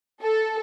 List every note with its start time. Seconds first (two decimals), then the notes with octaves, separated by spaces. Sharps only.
0.21 A4